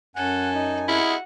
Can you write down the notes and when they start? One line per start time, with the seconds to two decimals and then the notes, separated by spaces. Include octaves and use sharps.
0.16 F#2 C#4 A4 F#5 G#5
0.54 D#4
0.88 E4 F#4 G#4 D#5 F#5 F6